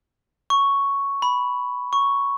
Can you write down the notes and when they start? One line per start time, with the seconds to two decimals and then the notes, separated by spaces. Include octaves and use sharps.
0.50 C#6
1.22 B5
1.93 C#6